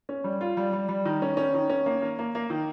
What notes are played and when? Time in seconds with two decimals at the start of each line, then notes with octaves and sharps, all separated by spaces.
0.09 C#4
0.24 G3
0.41 F4
0.57 G3
0.73 G3
0.89 G3
1.05 D#3
1.22 C#4
1.37 C#4
1.54 D#3
1.70 C#4
1.86 A#3
2.02 A#3
2.19 A#3
2.35 A#3
2.50 D#3